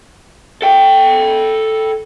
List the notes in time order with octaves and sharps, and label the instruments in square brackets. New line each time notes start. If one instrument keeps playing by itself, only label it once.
[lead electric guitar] A4 G5